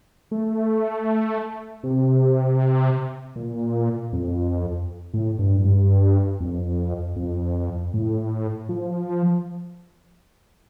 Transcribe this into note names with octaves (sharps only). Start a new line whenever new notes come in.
A3
C3
A#2
F2
A2
G2
G2
F2
F2
A2
F3